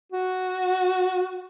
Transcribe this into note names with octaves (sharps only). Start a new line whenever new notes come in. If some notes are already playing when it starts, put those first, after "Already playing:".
F#4